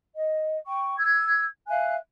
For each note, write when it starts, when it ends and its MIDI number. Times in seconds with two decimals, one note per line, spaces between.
0.15 0.56 75
0.67 0.96 79
0.67 0.96 85
0.98 1.45 88
0.98 1.45 92
1.68 1.95 76
1.68 1.95 77
1.68 1.95 80
1.68 1.95 90